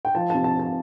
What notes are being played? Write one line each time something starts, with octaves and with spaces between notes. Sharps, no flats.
G5
F3 A5
C3 A5
A5
C3 A5